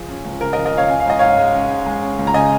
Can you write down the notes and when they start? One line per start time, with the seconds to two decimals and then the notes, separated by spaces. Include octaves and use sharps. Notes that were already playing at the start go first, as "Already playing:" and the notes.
Already playing: F3 G#4
0.09 C#4
0.25 C#2
0.41 C#3 A#4
0.53 A#4 D#5
0.57 F3
0.65 A#4 D#5
0.73 C#4 C#5 F5
0.89 C#4 G#5
1.00 F5
1.06 G#2 D#5
1.19 G#2 C#5 F5
1.38 G#3
1.54 C#4
1.70 G#2
1.86 G#3
2.03 C#4
2.19 C#2
2.27 A#5
2.34 C#3 D#5 G#5